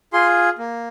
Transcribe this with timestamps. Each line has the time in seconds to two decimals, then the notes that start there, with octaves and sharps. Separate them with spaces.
0.13 F4 G#4 C6
0.58 A#3